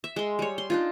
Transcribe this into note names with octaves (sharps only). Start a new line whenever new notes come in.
E5
G#3 C6
G3 C#5
C6
D4 D#4 F4